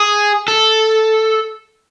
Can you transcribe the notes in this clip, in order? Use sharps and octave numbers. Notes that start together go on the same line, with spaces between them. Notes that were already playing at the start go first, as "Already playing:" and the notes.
Already playing: G#4
A4